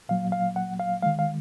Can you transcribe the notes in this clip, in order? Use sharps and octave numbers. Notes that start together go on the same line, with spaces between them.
A#2 F#3 A#3 F5
F5
F#5
F5
D#3 G#3 F5
F5